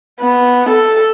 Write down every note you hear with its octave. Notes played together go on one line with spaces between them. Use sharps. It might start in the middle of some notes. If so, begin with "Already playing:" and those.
B3
A4